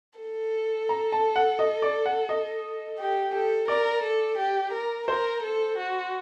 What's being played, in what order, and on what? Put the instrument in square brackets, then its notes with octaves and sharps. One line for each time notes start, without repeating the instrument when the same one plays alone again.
[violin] A4
[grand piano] A#5
A5
F#5
D#5
D5
F#5
D#5
[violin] G4
A4
[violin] A#4 [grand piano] D5
[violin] A4
G4
A#4
[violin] A#4 [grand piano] C5
[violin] A4
F#4